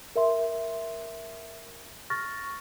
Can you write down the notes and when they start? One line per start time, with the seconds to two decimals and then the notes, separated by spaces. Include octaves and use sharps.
0.16 A#4 E5 C6
2.10 C#6 F6 A6 A#6